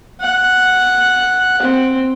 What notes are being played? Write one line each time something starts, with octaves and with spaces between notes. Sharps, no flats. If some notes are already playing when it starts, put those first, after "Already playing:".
F#5
C4